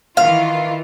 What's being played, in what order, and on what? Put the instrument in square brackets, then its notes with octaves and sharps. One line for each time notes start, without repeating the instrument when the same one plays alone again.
[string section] D#3 E3 F4 [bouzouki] F5